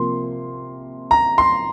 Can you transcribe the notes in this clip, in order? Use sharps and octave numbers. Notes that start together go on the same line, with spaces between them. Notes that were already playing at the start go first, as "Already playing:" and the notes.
Already playing: C3 F3 A#3 C6
A#5
C6